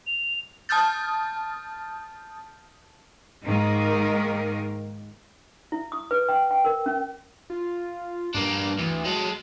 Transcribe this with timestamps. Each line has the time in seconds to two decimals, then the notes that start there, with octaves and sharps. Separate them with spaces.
0.07 F7
0.69 A5 D#6 F6 G6 A6
3.44 G#2 D#3 A#3 A#4
5.72 E4
5.92 D#6
6.11 B4
6.29 G5
6.51 G5
6.65 A#4
6.86 C#4
7.50 F4
8.35 G2 A#3 D4
8.79 D2 E3
9.05 F#3 G#3 A4